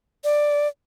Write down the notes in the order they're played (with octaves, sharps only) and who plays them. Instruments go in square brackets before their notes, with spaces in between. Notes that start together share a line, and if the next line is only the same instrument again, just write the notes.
[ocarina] D5